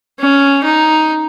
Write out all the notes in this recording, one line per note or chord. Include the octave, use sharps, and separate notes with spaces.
C#4
D#4